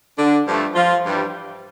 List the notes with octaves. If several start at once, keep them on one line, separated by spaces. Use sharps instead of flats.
D3 D4
G2 F3 A3
F3 F4
G2 E3 G3